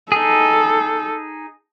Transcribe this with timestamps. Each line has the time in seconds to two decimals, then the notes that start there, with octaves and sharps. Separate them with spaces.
0.12 D#4 G#4 A4